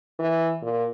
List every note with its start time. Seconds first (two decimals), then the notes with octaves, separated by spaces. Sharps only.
0.20 E3
0.63 A#2